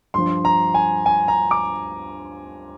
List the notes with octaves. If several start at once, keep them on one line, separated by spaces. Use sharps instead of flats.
G2 F3 C6
A#5
G#5
G#5
A#5
D6